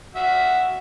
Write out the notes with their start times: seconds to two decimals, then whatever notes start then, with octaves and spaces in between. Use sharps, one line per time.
0.15 F#4 E5